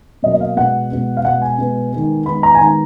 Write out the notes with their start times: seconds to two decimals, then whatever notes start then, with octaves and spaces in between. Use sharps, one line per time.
0.23 B2 F#3 A#3 D#5
0.34 D#5
0.40 F5
0.56 B2 G#3 B3 F#5
0.90 B2 G#3 B3
1.17 F5
1.25 B2 G#3 B3 F#5
1.42 G#5
1.59 B2 G#3 B3
1.93 D#3 G#3 B3
2.25 D#3 G#3 B3 B5
2.43 A#5
2.55 G#5
2.59 D#3 G#3 B3 A#5